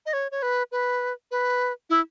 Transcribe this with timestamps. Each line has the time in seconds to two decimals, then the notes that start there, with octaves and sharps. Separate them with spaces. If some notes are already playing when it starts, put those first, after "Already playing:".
0.06 D#5
0.13 C#5
0.32 C#5
0.42 B4
0.72 B4
1.31 B4
1.90 E4